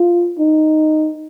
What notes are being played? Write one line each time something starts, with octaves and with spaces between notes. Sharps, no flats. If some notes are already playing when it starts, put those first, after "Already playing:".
Already playing: F4
D#4